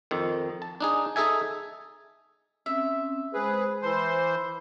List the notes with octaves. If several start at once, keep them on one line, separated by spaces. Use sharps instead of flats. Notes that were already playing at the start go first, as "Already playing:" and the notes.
F2 D#3
A5
D4 D#4 G#4
D#4 G#4 A4 E5 G#5
C4 C#4 E5
G#3 G#4 B4 C5 B5
E3 C5 A5 B5 C6 E6